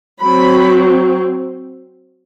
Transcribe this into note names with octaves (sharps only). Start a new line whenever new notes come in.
F#3 C4 B5